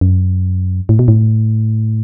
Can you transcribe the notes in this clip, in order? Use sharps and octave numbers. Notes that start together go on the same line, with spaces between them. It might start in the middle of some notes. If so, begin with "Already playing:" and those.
F#2
A2
B2
A2